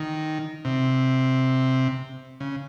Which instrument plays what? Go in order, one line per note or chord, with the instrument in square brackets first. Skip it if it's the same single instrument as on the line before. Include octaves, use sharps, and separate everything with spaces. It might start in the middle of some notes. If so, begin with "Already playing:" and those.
Already playing: [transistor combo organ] D#3
C3
C#3